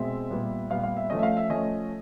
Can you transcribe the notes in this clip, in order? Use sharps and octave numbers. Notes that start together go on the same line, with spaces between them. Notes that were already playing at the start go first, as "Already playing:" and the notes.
Already playing: B2 G#3 C4 E5
A#2 G3 B3
A#2 G3 B3 F5
F5
E5
F3 A3 C#4 D#5
E5
F5
E5
F3 A3 C#4 D#5